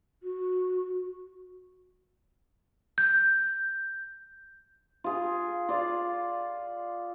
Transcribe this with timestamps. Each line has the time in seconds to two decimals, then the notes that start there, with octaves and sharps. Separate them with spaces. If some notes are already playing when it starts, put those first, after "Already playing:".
0.23 F#4
2.98 G6
5.04 F4 G#4
5.69 F4 D5